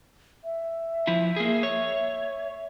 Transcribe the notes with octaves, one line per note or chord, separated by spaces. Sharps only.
E5
F3 E4
A#3 G#4
C#5